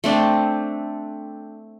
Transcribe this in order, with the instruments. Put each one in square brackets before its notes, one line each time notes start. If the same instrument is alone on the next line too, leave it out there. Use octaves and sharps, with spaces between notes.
[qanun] A3 C4 D4